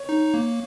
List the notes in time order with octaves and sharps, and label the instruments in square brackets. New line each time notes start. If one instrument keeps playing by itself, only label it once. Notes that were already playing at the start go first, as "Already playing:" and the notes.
Already playing: [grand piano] C#5
[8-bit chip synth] D#4
A#3